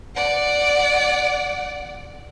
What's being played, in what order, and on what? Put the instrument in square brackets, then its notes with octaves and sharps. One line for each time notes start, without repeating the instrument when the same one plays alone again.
[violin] D5 F#5